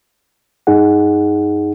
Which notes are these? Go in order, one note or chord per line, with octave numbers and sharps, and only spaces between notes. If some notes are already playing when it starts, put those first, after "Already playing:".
G2 D#4 G#4 F#5